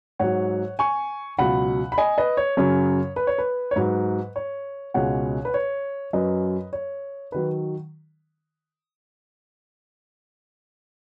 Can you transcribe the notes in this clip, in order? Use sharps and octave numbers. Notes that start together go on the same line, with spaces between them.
G#2 F#3 C#5 F#5
G#5 C#6
C#2 B2 F#3 F#5 B5
B5
D#5 G#5
B4 D#5
C#5
F#2 C#3 F#3 C#5
B4
C#5
B4
C#5
G#2 F#3 B4
C#5
C#2 B2 G#3 C#5 F#5
B4
C#5
F#2 F#3 B4 D#5
C#5
D#3 F#3 B4